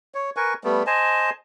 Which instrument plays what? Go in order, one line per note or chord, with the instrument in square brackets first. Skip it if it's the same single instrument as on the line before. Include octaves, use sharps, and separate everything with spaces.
[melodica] C#5
A#4 B4 G#5 C#6
G3 A3 B3
C5 D#5 G#5 A5